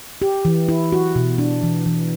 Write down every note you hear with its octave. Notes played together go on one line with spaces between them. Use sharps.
G4
E3
E4
F#4
B2
D4
E3
E3